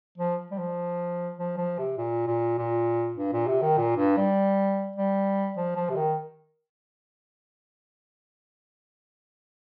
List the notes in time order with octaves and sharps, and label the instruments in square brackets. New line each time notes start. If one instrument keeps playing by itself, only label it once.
[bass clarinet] F3
G3
F3
F3
F3
C3
A#2
A#2
A#2
G2
A#2
C3
D#3
A#2
G2
G3
G3
F3
F3
C3
D#3